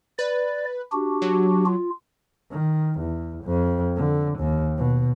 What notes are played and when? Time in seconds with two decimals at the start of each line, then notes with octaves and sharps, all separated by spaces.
0.19 B4 D5
0.92 D4 F#4 G4
1.22 F#3
1.66 F4
2.51 D#3
2.99 E2
3.44 F2
3.96 D3
4.39 D#2
4.77 B2